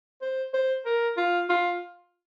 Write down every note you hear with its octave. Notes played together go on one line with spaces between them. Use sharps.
C5
C5
A#4
F4
F4